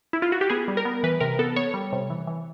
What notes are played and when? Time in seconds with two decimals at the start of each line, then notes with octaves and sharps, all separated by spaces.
0.13 E4
0.22 F4
0.32 F#4
0.41 G4
0.50 B3 G#4
0.68 G3
0.77 A#4
0.85 B3
1.03 E3 B4
1.20 C3 A#4
1.39 B3 A4
1.56 B3 C#5
1.74 G3
1.92 C3
2.10 E3
2.27 E3